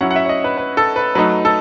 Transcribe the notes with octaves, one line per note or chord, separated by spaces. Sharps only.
F#3 C#4 E4 F#5
F#5
E5
C#5
D#5
B4
B4
A4
B4
F#3 A3 D#4 B4
A4